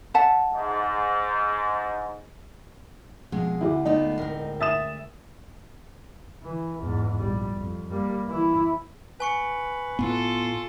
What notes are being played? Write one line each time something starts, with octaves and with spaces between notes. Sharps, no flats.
E5 F#5 A5
G#2
F2 B2 G#3 G#4
D2 E4 F#4 G4
A3 B3 D#4 F4
A2 C4 A#4 C7
E5 D#6 A6 E7
E3
E2 G#2
A#1 G3
F2
G3 A#3
E3 E4
B4 G#5 C#6 C#7
A2 B3 F4 A4